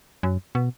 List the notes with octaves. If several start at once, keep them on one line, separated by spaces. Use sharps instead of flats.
F#2
B2